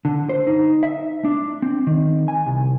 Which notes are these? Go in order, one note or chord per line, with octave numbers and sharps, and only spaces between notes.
D3
C5
D#4
E5
D4
C4
D#3
G#5
C2